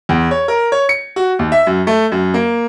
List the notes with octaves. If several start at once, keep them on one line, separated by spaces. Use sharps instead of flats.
E2
C#5
A#4
C#5
C#7
F#4
D#2
E5
F#2
A3
F#2
A#3